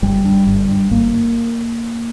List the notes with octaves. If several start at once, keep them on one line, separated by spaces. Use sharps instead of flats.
G1 G3
G2
G1
G2
G1 A#3